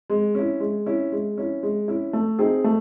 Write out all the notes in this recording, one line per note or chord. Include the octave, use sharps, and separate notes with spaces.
G#3
C#4 E4
G#3
C#4 E4
G#3
C#4 E4
G#3
C#4 E4
A3
C4 D#4 G#4
A3